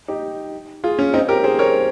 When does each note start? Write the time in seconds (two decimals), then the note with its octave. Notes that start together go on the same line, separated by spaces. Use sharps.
0.08 D#4 G4
0.84 F4 G#4
0.99 C#4
1.14 C4 D#4
1.29 G4 A#4
1.44 G#4 C5
1.59 A#4 C#5